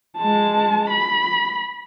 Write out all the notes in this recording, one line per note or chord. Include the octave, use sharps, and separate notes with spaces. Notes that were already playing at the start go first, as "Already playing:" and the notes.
G#3 A5
B5